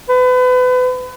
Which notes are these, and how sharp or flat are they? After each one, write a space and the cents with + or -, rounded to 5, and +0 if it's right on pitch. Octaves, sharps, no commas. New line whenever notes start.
B4 +30